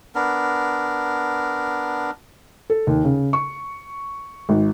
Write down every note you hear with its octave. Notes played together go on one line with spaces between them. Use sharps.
B3 D4 A#4
A4
D#2
C#3
C#6
G#1